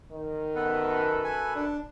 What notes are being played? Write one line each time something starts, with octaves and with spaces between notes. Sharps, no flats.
D#3
F#2 B3 A4 B4
G#5
D4